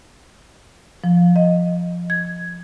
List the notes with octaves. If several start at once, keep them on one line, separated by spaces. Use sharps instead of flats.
F3
D#5
G#6